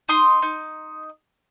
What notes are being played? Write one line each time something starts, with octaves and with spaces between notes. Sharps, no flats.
D#4 C6 D#6
D#4